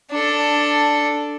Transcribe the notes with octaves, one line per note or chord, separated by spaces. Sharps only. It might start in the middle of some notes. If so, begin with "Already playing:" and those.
D4 A4